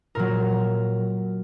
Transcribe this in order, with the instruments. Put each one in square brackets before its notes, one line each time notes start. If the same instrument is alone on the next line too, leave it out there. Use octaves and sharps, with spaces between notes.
[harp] A#2 F#3 A#4